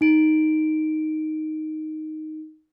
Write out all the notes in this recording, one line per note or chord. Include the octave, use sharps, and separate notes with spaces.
D#4 D7